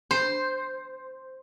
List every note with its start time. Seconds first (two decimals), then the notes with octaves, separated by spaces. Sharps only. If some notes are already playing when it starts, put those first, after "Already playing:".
0.11 C5